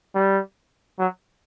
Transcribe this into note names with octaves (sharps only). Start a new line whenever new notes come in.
G3
F#3